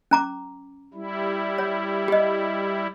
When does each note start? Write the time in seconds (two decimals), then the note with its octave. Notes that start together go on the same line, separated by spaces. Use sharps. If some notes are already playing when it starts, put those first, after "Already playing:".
0.11 C#4 A#5 D6
0.94 G3 E4
1.58 C#5
2.08 G4 D#5